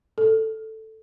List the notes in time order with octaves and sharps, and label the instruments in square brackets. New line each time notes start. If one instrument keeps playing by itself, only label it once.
[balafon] A4